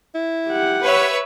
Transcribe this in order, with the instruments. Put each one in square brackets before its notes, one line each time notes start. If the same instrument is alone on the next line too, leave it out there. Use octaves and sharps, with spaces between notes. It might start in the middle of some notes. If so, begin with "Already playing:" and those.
[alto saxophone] E4
[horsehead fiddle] G4 F#5
[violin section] B4 C#5 E5